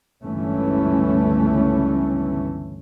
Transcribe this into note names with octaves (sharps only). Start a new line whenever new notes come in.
G1 C#2 E3 A3 C#4